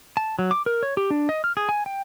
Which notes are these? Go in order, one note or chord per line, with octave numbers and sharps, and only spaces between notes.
A5
F#3
D6
A#4
C#5
G4
D4
D#5
F6
G#4
G#5
G5